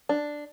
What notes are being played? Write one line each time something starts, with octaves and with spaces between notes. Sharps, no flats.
D4